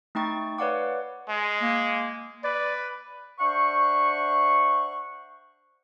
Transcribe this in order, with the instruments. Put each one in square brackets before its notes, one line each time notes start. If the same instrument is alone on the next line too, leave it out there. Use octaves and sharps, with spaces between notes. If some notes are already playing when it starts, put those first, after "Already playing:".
[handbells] A3 D#4 G5 C#6 A6
B4 C#5 D5 F5 F#5 D6
[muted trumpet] G#3
[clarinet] A#3
[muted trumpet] B4 [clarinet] D5
[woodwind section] D4 C5 E5 F#5 C#6